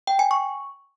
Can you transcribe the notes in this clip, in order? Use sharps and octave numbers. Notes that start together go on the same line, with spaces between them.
G5
G#5
C#6